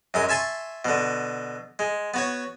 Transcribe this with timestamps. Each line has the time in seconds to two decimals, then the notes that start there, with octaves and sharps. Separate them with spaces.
0.14 F#2 G#3 D#6
0.29 E5 G#5 A5 C6 C#6
0.85 B2 D3
1.79 G#3
2.14 B3 F#4 C#5